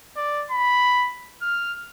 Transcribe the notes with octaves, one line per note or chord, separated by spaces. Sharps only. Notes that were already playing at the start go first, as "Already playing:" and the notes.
D5
B5
F6